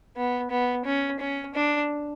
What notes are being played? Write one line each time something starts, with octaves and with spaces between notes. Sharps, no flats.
B3
B3
C#4
C#4
D4